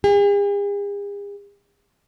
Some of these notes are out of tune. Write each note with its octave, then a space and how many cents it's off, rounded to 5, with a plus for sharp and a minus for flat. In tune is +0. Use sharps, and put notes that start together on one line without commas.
G#4 -45